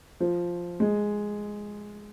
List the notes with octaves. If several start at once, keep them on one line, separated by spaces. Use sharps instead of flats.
F3
G#3